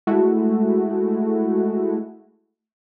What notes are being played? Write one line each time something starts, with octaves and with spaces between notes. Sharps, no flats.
G#3 A3 E4 F#4